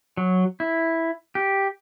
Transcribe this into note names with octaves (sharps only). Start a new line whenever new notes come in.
F#3
E4
G4